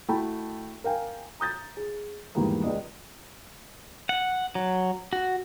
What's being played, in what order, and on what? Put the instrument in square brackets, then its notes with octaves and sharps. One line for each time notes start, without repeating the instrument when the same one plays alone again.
[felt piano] A3 E4 F#4 G5 A5 B5
A#4 F5 G5 G#5
A#5 D#6 G6 A6
G#4
E2 G#2 D#3 G3 G#3 A#3
C#2 G#3 D5 D#5
[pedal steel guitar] F#5
F#3
F#4